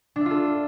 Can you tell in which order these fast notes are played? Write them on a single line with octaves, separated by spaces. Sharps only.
D4 E5 F4 A4